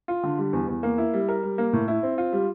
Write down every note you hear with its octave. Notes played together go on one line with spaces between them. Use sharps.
F4
D3
G3
E2
E2
A#3
E4
G3
A#4
G3
A#3
A2
E4
C4
F4
G3